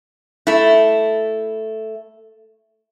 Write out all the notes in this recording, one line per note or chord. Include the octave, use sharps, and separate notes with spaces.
A3 E4